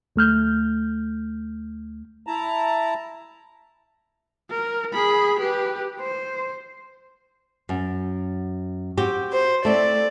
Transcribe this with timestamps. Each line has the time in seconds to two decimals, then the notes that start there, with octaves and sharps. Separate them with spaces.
0.16 D2 A3 F6 G6
2.27 E4 A5 A#5
4.50 A#4
4.93 G#4 B5
5.39 G4 B4
6.00 C5
7.69 F#2
8.97 C4 F#4 G4
9.32 C5
9.65 A3 C4 E4 D5